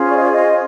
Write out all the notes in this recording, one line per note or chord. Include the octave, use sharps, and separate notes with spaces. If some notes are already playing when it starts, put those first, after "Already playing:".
Already playing: C#4 F4 G#4 C5
D5
D#5
D5
D#5